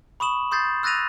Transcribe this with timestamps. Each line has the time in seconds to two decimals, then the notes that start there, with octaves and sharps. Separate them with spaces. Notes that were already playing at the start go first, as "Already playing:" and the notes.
0.20 B5 C#6 D#6 E7 F#7
0.51 C6 D#6 G6 A6 C7
0.83 E6 F#6 A6 A#6 D#7 F7